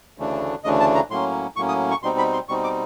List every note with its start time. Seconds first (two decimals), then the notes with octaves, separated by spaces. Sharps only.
0.18 D2 C#3 E3 A3 D4
0.64 D2 C#3 E3 A3 D4 D#5
0.80 A5
0.95 A#5
1.10 A2 F#3 A#3 C#4 C6
1.56 A2 F#3 A#3 C#4 C#6
1.68 D#6
1.91 C#6
2.03 B2 G3 C4 D#4 C6
2.18 B5
2.33 C6
2.49 B2 G3 C4 D#4 C#6
2.64 D6